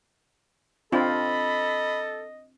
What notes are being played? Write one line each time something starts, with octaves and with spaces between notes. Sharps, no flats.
C4 D4 F4 A4 D#5 B5